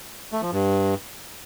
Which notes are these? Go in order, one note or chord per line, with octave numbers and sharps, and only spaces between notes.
A3
F3
G2